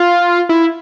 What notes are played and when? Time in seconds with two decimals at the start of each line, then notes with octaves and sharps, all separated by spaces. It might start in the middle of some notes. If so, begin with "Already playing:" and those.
Already playing: F4
0.49 E4